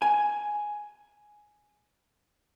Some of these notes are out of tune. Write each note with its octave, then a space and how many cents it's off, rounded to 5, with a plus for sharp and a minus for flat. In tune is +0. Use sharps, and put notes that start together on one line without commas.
G#5 +5